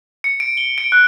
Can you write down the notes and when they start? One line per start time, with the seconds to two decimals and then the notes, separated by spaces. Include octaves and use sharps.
0.24 C#7
0.40 D7
0.57 G7
0.78 D7
0.92 F#6